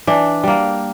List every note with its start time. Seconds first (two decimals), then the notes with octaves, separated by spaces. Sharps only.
0.07 E3 D4
0.43 G3 A#3